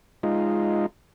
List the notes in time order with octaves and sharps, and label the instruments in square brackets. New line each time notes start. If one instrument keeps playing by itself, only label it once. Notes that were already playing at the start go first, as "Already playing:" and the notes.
[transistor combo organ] G#3 D#4 F4